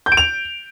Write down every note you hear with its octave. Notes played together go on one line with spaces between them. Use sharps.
G6
D7
F7